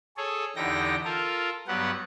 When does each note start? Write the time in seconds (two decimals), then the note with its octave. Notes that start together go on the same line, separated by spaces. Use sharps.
0.17 G#4 A4 C#5
0.56 E2 D3 D#4 G4 G5 A#6
1.05 F4 A4 A#4
1.67 G2 F#3 B3 G4 F#5